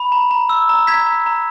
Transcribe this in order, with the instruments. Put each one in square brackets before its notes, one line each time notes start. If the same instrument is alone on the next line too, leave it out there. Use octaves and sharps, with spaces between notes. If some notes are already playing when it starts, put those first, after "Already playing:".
Already playing: [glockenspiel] B5
A#5
A#5
E6
A#5
A#5 G#6 B6
A#5
A#5